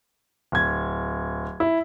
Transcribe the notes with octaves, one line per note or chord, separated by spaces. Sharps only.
D1 G#6
E4